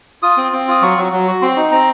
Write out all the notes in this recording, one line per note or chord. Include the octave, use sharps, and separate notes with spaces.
F4 D#6
C4
C4
F4 D#6
F#3 C#6
F#3
F#3
F#4
C4 C6
D#4
C4 A#5